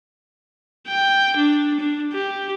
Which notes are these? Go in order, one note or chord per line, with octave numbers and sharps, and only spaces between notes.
G5
D4
D4
G4